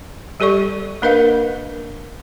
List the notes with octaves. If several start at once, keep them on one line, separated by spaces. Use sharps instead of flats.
G3 G4 A4 D5 C#6
A#3 D4 A#4 B4 D#5 F5